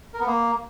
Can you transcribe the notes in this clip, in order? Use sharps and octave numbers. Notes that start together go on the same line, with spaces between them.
A#4
B3
A#3